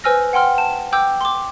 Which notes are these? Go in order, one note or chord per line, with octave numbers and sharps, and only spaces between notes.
B4 C5 G#5 E6 F6 A#6
F#5 G5 C6 F6
A5
G5 D6 E6 G6
C6 D6